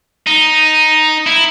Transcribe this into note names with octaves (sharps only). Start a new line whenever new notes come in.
D#4
E4